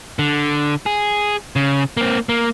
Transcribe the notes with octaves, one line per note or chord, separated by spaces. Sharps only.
D3
G#4
C#3
A#3 C4
A#3